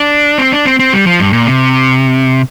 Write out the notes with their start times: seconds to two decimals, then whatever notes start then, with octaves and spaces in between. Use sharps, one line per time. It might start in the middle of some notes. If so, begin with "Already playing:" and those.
Already playing: D4
0.38 C4
0.52 D4
0.65 C4
0.79 C4
0.93 G3
1.06 F3
1.20 G2
1.33 A#2
1.47 C3